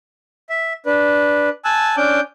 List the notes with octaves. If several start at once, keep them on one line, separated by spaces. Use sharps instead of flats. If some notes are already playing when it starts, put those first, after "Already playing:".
E5
D4 B4
G#5 A5 E6 F#6
C#4 D4 D6 G6